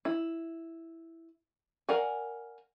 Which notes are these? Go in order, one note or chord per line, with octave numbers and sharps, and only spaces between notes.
E4
A#4 D5 F5 F#5 G#5